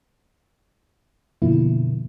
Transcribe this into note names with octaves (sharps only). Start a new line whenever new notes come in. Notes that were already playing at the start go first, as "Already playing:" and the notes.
F#2 B2 D3 F3 A#3 E4